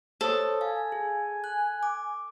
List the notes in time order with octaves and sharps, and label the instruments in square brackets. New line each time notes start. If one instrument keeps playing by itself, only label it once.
[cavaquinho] A4 [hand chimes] C5 C#5 D#6
[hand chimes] F5 [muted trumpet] G#5
[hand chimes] G#4
F#6
D6